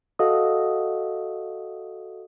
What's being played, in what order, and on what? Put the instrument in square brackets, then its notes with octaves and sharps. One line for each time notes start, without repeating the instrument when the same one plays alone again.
[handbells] F#4 A4 D#5 F5 F#5 D#6